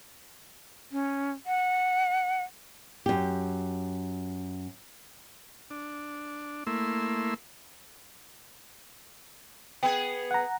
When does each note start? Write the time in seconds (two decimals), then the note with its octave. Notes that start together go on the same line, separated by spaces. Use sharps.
0.92 C#4
1.46 F#5
3.06 F#2 G4
5.70 D4
6.67 A3 A#3 E4 C6 E6
9.83 B3 G#4 G5
10.31 F#5 A#5